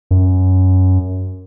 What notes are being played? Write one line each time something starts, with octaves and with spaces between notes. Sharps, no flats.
F#2